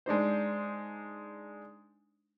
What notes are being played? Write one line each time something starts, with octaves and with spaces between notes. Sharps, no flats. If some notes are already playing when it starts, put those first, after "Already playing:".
G#3 D4 D#4 C5